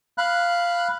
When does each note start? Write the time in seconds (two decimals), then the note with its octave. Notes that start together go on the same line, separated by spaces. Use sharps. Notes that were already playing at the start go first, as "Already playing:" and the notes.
0.18 F5 B5 F#6